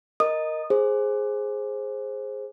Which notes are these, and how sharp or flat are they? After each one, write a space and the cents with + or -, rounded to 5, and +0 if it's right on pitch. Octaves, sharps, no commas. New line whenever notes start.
A#4 +0 D#5 +0 D#6 -20
G#4 +0 C5 +15